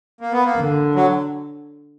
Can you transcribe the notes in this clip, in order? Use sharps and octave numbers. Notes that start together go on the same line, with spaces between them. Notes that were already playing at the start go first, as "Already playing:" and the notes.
A#3
B3
A#3
D3
F#3